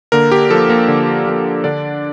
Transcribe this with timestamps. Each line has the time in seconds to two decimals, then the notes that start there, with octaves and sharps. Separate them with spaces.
0.12 D3 A#3 A#4
0.31 G4
0.50 F3 A#3 A4
0.69 A#3 A#4
0.88 D3
1.26 F3 A#3
1.64 D3 D4 D5